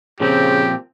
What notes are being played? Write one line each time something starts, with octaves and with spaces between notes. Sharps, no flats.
A#2 C#3 F3 C4 G4